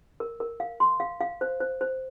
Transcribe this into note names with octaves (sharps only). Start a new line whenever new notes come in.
A#4
A#4
F5
C6
F5
F5
C5
C5
C5